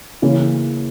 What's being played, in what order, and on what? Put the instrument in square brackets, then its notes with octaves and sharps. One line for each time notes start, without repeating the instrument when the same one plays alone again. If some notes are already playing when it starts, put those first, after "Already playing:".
[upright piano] C#3 E3 A#3 C#4